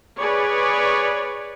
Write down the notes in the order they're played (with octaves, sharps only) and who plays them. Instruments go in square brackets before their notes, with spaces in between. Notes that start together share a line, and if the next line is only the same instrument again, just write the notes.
[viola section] G#4 B4 C#5 D5